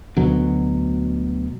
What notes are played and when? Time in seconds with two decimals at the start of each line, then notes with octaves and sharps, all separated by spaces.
0.16 D2 B2 F#3